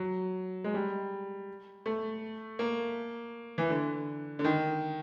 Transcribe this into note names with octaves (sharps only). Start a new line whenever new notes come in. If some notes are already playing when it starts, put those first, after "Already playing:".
Already playing: F#3
G#3
G3
A3
A#3
E3
D3
D3
D#3